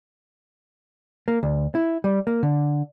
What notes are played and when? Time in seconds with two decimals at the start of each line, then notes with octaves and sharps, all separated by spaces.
1.28 A#3
1.43 D2
1.75 E4
2.04 G3
2.27 A#3
2.43 D3